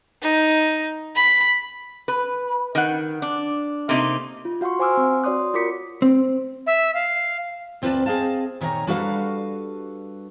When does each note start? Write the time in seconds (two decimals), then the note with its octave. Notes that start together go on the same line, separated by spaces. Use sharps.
0.22 D#4
1.16 B5
2.08 B4
2.75 D#3 F#5
3.22 D4
3.89 C3 A3 A#3 D#4
4.45 F4
4.61 F#4 F5 F#5 C6 C#6
4.79 C5 G#5 C6 D6 E6 F6
4.97 C4
5.24 F#4 C#5 D5 C6 D#6 F#6
5.54 F4 F#4 A#4 D6 B6 C#7
6.02 C4
6.67 E5
6.94 F5
7.82 D2 C4 F4 B4 D5 A5
8.06 C4 G#4 D#5 F5 A5
8.61 A#2 D#3 C#5 D5 A#5
8.87 G3 D4 F#4 A4 B4 F5